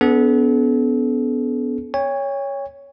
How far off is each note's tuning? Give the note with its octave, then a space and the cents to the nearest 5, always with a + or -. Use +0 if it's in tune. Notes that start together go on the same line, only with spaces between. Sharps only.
B3 +5 D4 -40 A4 -35
C#5 +5 G5 +45